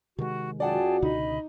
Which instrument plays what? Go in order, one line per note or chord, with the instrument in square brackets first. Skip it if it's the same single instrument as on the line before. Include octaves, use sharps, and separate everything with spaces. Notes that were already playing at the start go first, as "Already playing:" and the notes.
[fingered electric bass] C3 D#3 G#3 [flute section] F#4
[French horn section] F#2 F4 F#4 [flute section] G#4 G5 A5 [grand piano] D5 F#5
[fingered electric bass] C#2 B2 D3 [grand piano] D#4 [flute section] D#5 B5